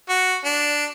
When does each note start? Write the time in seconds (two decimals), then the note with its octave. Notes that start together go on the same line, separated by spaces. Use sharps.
0.09 F#4
0.45 D4